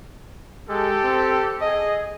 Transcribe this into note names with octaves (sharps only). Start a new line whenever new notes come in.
G#3 G4 A4
C4
G#4 D#5